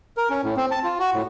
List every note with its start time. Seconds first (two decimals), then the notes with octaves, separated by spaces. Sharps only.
0.17 A#4
0.30 C#4
0.44 A2
0.57 C4
0.71 A5
0.84 F4
0.99 F#4
1.14 A2